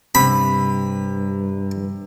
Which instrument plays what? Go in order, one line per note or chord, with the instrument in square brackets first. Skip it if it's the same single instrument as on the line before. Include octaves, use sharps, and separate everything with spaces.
[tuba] G2 [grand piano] C3 [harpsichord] B5